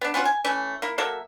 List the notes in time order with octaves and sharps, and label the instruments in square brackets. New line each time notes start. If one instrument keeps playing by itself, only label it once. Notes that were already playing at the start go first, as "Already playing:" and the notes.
[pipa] B3 D4
B3 C#4 F4 F#4
G#5
E3 A3 C#4
A#3 E4
F#3 A#3 A4 E5